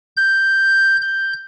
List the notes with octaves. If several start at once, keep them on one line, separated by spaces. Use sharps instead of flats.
G6
G6